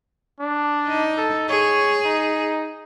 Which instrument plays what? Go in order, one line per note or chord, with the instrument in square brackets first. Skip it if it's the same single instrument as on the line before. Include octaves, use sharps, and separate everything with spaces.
[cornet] D4
[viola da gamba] D#4
[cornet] A4
[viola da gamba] G#4 [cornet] C#5
[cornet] D#4